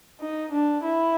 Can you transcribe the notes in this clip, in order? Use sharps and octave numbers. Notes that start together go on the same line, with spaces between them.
D#4
D4
E4